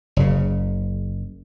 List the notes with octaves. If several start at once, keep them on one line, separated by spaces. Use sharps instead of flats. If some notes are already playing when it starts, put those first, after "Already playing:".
F#1 C#3